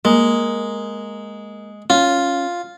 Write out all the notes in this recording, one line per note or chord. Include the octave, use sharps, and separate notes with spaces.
G#3 A#3
C#4 F4